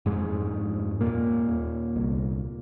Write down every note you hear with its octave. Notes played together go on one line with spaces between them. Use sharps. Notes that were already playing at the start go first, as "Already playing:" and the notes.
F2 G#2 G#3
F2
D#2 A#2 A#3
D#2
C2